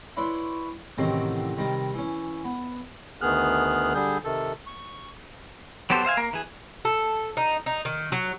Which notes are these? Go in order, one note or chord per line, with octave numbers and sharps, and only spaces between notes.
E4 B4 C#5 D5 C6
A1 A2 C3 D#3 F#3 C4
C3 D#3 G3 A#4
E3 C#4
B3
D2 D#3 B3 G#4 F6 F#6
D3 G3 G#4 G6
C3 D#3 A4
C#6
F#3 B3 G4 A4 C5
C5 E5 F5 G#5
A#3 A#4
E3 G#4
A4
D#4
D#4
D#3
F#3